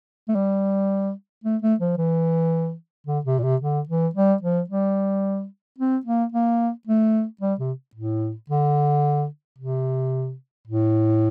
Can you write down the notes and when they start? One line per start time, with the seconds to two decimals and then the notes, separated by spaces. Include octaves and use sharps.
0.28 A3
0.35 G3
1.44 A3
1.62 A3
1.80 F3
1.98 E3
3.07 D3
3.25 C3
3.39 A#2
3.43 C3
3.62 D3
3.89 E3
4.15 G3
4.42 F3
4.70 G3
5.78 C4
6.06 A#3
6.32 A#3
6.87 A3
7.41 G3
7.60 C3
7.95 A2
8.50 D3
9.58 C3
10.67 A2